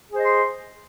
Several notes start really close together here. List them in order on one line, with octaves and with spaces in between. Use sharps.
G#4 C5 D#5 C6